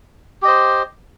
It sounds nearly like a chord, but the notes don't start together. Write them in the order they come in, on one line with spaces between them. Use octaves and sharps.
G4 D#5 C5